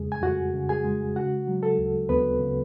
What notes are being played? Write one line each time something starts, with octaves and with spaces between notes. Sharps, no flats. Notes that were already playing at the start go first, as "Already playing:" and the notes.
Already playing: F2 C#3 G#3 G#4
G#5
F2 F#4 F#5
C#3
G#4 G#5
G#3
C#3 F#4 F#5
F#3
A4
D2
D2 B3 B4
C#3